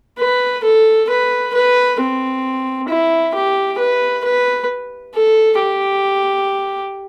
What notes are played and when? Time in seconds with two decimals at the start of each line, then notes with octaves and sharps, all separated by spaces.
0.19 B4
0.64 A4
1.10 B4
1.54 B4
2.00 C4
2.89 E4
3.35 G4
3.79 B4
4.25 B4
5.15 A4
5.59 G4